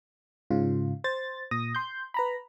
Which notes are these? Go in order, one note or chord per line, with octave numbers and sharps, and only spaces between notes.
G#2 C#3 F4
C5 A6
A#2 D#6 A#6
C6 G6
B4 A#5 B5